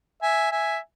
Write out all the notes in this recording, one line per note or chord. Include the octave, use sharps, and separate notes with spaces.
E5 G#5
E5 G#5